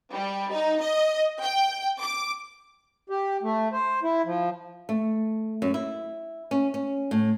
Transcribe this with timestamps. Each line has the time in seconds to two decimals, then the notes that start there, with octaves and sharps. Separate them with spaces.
0.12 G3
0.51 D#4
0.81 D#5
1.42 G5
2.00 D6
3.10 G4
3.43 A3
3.72 C5
4.03 E4
4.25 F3
4.89 A3
5.62 F#2
5.74 E4
6.51 C#4
6.74 C#4
7.11 A2